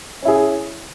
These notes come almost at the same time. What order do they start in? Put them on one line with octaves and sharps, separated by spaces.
C#4 E4 G#4